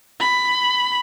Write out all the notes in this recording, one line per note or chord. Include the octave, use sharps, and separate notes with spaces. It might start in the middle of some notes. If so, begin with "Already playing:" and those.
B5